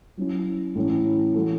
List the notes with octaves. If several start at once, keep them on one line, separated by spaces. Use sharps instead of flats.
F#3 C#4 E4
A2 E3 C#4 E4
E3 A3 F#4 A4